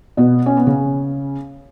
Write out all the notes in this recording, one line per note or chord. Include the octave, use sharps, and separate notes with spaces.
B2 B3
C#4
B3
C#3 C#4